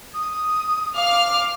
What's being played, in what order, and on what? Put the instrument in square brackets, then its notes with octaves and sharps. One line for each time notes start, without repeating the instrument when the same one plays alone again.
[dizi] D#6
[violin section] F5 F6 [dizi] D6